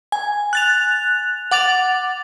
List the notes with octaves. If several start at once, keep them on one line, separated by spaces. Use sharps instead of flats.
G#5
F#6 A6 F7
F#5 D6 A6 F7